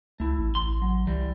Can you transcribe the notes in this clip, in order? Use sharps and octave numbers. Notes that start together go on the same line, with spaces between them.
C#2 A3 E4
A1
A1 C6
F#3
C2 E3 G3